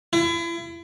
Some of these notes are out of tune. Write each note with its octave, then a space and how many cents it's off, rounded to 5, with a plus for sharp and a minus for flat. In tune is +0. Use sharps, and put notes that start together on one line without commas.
E4 +35